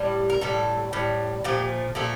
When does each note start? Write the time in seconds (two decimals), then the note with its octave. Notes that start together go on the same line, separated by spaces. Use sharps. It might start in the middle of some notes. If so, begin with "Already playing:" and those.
Already playing: A2 G3
0.30 A#4
0.41 A2 G3 A4
0.93 A2 G3
1.44 A#2 F3 A3 G4
1.95 A#2 F3 A3 A4